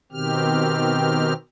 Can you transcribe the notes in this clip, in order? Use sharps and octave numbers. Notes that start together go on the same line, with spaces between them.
B2 D#3 C4 G4 F6